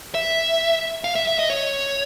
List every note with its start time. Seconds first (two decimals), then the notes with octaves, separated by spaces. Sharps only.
0.14 E5
1.04 F5
1.15 E5
1.27 E5
1.39 D#5
1.50 C#5